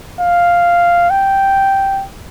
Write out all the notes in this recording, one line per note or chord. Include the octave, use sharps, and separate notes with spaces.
F5
G5